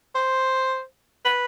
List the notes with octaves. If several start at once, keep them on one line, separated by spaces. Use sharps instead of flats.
C5
B4